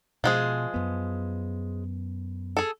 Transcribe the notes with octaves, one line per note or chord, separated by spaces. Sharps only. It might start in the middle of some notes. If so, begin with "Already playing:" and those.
B2 F3 G#3 G#4
F#2 B3
G#4 A4